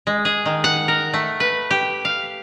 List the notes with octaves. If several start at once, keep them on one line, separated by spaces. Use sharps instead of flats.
G#3
G#4
D#3
F#5
A#4
A3
B4
G4
F5